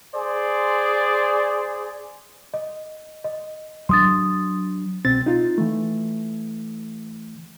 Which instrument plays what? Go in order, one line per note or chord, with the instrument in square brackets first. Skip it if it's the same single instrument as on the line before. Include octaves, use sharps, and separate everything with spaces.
[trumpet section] G#4 C5 D5
[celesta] D#5
D#5
[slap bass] F#3 D4 [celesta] C6 D#6 A6
[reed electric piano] C2 B2 C4 A6
D#4 F4
E3 A3